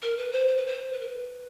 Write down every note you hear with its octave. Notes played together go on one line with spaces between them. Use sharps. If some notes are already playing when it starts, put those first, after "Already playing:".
A#4
B4
C5
C5
B4
C5
B4
A#4
B4